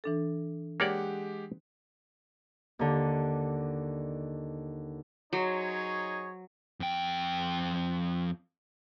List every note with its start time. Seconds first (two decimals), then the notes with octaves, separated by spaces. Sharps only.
0.04 E3 D4 A4
0.80 G#3 A#3 G4 C#5 D5 F#5
2.79 D#2 D3
5.33 F#3 D#4 G#4 C5 C#5
6.80 F2 G5